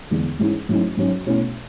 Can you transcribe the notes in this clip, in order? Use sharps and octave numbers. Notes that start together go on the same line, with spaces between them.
E2 D3 G#3 D4
G#2 E3 G#3 C#4 E4
G#2 F#3 A3 C#4 E4
G#2 F#3 C#4
B2 A3 C#4 E4